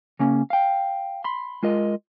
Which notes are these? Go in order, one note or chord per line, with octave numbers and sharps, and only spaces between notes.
C#3 A#3 C#4
F5 G5
B5 C6
G#3 F4 A#4 D#5